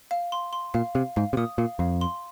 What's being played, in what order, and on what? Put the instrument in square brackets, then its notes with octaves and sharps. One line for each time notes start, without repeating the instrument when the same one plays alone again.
[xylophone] F5
C6
C6
[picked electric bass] A#2 [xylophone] F5
[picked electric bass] C3 [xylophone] F5
[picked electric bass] G#2 [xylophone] F5
[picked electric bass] C3
[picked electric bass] A#2 [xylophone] D#6
[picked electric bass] A#2 [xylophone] F5
[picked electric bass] F2 [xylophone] F5
[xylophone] C6